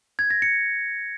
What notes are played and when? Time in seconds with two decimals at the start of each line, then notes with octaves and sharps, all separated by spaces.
0.19 G#6
0.30 A#6
0.42 C#7